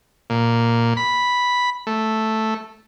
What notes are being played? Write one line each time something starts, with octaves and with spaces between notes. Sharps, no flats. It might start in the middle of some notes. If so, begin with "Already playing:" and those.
A#2
B5
A3